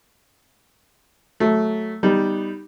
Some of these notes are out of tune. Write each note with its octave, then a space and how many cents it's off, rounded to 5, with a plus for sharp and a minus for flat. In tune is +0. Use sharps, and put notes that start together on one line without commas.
F#3 +0 A3 -10
G3 +0 B3 +10 D#4 +0